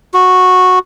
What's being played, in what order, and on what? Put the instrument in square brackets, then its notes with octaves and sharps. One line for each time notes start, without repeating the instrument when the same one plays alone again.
[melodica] F#4